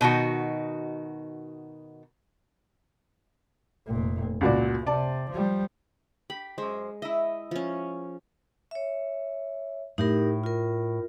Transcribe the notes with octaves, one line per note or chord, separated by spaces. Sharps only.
B2 D#3 D#4 F#4
F1 A#2
C#2 A#2 F#4 D5
C3 D5 A5
F3 G3
G4 B5
F#2 G#3 C5
E4 D#5 E5
F3 C#4
C#5 E5
A2 D#4 G4 A#4
F4 A#4